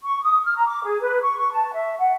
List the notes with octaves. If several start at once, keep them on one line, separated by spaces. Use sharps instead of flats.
C#6
D#6
F6
A#5
D6
G#4
B4
C#6
C#6
A5
E5
F#5